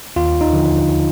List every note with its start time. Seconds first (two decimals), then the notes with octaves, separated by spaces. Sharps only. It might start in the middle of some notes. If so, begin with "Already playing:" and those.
0.16 D#2 F4
0.41 D#4
0.53 D3 F3